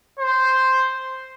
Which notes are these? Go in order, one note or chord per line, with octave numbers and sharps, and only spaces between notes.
C5